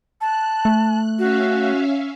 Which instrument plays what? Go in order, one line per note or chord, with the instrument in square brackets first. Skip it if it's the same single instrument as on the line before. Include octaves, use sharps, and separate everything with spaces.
[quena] A5 [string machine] F#6
[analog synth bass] A3
[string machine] C#4 E5 F5 [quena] F#4